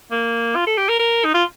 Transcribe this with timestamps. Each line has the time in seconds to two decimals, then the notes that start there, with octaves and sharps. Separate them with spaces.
0.12 A#3
0.55 F4
0.67 A4
0.78 G4
0.89 A#4
0.99 A#4
1.24 D#4
1.34 F4